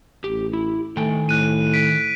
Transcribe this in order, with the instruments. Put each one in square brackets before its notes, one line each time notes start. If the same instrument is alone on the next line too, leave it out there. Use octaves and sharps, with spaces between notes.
[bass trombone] A1 [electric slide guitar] G4
[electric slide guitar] E4
[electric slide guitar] D#3 G5 G#5 [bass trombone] A3
[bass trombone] A2 [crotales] F#6 D#7
[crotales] B6 D7